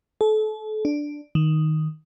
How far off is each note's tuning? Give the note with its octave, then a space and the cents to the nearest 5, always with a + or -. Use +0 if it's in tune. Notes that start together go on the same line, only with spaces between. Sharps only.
A4 -35
D4 +0
D#3 +0